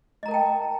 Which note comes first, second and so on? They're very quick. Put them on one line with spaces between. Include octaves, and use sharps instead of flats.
D#5 A#5 A#4 A5 G5